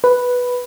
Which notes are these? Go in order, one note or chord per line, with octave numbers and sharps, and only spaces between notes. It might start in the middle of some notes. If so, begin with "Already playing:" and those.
B4